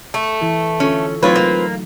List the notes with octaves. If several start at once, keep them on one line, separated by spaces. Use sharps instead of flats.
A3
E3 E4 A4
D3 C#4 F4 A4
F#3 A3 C4 D#4 F4 B4 C#5
A#3